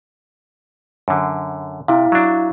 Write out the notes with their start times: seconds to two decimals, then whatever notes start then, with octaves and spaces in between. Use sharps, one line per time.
1.08 F#2 D3
1.88 C3 E4 F5
2.12 F#3 D4